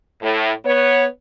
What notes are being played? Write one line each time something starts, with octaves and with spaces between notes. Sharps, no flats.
A2
B3 C#5